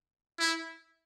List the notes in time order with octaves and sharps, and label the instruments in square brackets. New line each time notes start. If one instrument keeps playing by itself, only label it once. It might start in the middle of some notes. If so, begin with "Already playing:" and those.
[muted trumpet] E4